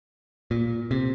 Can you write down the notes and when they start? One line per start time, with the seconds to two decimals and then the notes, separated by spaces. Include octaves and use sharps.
0.51 A#2
0.91 C3